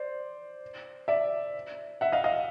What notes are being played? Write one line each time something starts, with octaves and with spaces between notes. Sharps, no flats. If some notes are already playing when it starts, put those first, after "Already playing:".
Already playing: C5 D5
D5 E5
E5 F#5
D#5 F5
D#5 F5